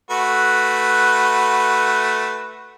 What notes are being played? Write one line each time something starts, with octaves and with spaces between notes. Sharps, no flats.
A3 F#4 B4